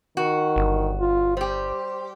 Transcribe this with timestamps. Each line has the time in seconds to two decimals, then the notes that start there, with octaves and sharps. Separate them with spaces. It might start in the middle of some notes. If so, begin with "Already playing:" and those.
0.17 D#3 F#4
0.56 G1
1.00 F4
1.37 G3 G4 C5